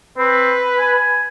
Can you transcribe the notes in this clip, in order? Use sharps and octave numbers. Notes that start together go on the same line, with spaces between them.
C4 B4
G#5